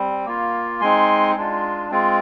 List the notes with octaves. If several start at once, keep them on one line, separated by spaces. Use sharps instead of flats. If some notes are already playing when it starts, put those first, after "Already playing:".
Already playing: G3 C4
A#3 F4
G#3 C4 D#4 G#5 C6
G#3 D4 F4
G#3 C4 F4